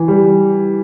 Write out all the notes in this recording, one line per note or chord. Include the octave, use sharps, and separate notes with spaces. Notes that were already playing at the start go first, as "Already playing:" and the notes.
Already playing: E3
G3